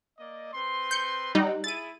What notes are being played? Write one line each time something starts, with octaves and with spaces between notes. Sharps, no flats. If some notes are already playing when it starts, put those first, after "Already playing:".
A#3 D5 D#5
C4 B4 C6
G6 C#7
G3 C4 D#4 F#5
E4 G#4 A6 D#7